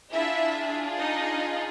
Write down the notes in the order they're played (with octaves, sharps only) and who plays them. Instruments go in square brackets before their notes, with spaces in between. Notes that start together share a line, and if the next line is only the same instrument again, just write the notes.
[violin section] D4 E4 F4 G#4 E5
D#4 D#5